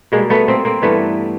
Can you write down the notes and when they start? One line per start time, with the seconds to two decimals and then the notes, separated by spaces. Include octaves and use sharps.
0.12 B2 G3 G#3 A#3
0.30 A3 B3
0.48 A#3 C4
0.65 A#3 C4
0.82 G2 E3 G3 A3 B3